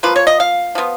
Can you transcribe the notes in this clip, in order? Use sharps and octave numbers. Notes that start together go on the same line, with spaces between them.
F3 A#3 F4 B4
C#5
D#5
F5
F3 B3 F4